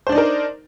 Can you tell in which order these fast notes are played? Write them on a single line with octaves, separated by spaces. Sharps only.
C5 D4 D5 D#4 A#4